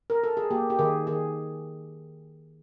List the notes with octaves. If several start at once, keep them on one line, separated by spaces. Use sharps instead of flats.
A#4
A4
G#4
A#3 G4
G4
D#3 G#4
D#3 G#4